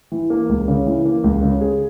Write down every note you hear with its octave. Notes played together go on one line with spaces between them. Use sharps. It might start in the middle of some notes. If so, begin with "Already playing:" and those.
E3
A#3
C#2
C#3
E3
A#3
C#2
C#3
G#4